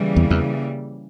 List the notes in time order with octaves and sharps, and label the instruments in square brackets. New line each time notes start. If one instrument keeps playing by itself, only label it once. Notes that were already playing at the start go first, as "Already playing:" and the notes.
Already playing: [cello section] C#3 E3 G3 A#3
[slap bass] E2
E2